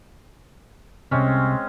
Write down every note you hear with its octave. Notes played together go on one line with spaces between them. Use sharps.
C2 G2 C3 G#3 C4 C#4